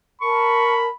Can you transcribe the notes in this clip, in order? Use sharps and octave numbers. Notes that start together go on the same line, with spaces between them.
A#4 A5 B5 C#6